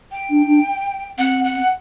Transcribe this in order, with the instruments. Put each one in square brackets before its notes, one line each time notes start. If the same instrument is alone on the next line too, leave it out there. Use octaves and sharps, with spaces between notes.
[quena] G5
[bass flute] D4
D4
[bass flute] C4 [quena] F#5
[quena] F#5